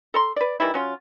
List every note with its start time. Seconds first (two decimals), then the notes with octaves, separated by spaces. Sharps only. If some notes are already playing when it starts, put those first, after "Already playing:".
0.14 A4 A#5 C6
0.36 B4 D5
0.60 D#3 E3 G3 E4
0.74 F#3 C#4 F4